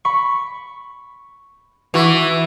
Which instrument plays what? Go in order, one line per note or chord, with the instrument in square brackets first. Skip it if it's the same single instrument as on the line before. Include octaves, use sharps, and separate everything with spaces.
[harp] B5 C#6
[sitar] E3 [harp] F#4 C#6 D6